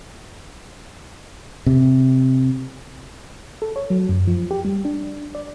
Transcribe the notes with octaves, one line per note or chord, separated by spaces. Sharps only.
C3
A4
C#5
F#3
F#2
F3
G4
G3
D4
D5